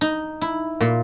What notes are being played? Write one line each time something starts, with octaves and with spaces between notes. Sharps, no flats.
D#4
E4
A#2